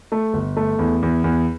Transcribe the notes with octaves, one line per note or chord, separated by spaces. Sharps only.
A3
G1
A3
E2
E2
E2